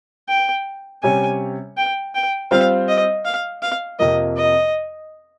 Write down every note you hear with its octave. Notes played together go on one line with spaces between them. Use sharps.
G5
C3 G3 C#4 G4 C#5 G#5
G5
G5
G3 C4 F4 C5 F5
D#5
F5
F5
F2 C3 F3 A#3 D#5
D#5